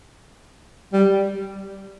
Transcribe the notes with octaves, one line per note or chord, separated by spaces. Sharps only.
G3